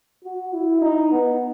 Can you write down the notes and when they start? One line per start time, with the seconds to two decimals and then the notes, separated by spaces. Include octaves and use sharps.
0.24 F#4
0.53 E4
0.82 D#4
1.12 B3